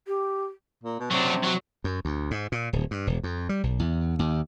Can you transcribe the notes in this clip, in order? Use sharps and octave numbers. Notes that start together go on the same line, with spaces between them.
G4
A#2
B2
C3 F#3 D4
F#3
F#2
D2
G#2
A#2
D1
G2
E1
F2
G3
B1
E2
D#2